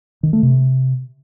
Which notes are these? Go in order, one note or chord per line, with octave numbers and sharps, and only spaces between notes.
D#3
A3
C3